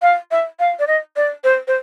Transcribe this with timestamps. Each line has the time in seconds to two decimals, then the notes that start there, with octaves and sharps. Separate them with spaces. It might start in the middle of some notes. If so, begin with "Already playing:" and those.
0.02 F5
0.31 E5
0.59 F5
0.79 D5
0.87 D#5
1.16 D5
1.44 C5
1.68 C5